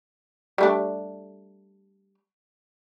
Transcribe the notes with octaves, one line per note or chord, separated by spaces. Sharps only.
G3 A3 D4